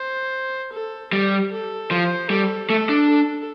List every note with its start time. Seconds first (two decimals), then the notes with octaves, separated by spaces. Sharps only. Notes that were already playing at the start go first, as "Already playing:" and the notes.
Already playing: C5
0.73 A4
1.12 G3 G4
1.52 A4
1.91 F3 C5
2.30 G3 A4
2.69 A3 A4
2.89 D4
3.09 A4